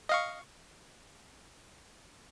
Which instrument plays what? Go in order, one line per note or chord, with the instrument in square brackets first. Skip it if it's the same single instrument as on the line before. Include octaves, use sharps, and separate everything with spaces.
[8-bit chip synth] D#5 F5 C#6